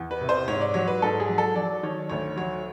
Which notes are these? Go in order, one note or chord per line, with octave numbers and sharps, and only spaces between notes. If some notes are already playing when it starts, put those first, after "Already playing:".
Already playing: E2
B4
C3
C5
G#2 C#5
D5
F#3 C#5
B4
G#2 A4
G#4
F#3
A4
F#3 D5
D#3 C#5
D2 C#5
F#3 C#5